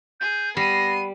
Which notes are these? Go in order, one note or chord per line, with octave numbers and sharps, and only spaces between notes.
G#4 G6
G3 B3 A#6 C7 D#7